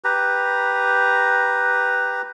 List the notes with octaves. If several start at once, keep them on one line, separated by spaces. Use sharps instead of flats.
G4 B4 A#5